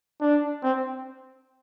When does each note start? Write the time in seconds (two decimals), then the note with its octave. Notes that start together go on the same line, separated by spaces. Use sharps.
0.21 D4
0.63 C4